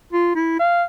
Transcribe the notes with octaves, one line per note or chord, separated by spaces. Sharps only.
F4
E4
F5